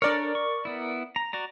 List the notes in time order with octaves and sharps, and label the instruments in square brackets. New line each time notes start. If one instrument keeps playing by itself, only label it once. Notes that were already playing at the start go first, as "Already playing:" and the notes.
[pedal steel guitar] D4 A4 C#5 [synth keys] A#4 D5
[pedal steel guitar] C#6
B3 E4
A#5
F#4 D5 A#5